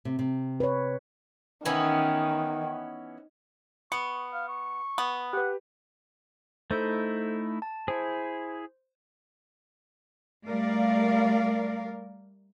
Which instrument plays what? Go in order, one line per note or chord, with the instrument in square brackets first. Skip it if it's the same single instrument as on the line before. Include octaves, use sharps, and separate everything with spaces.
[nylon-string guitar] C3
C3
[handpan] B4 C#5
[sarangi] D#3 [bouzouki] E3 B3 C#4
[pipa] B3 [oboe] C#6 [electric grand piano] C#7
[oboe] F5
C#6
[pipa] B3
[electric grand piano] G4 B4 [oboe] F#5
[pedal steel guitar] A3 D#4 E4 [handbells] A4 C5 G6
[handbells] A5
[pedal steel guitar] E4 G#4 [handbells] C5
[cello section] G3 A3 A#4 D5 F5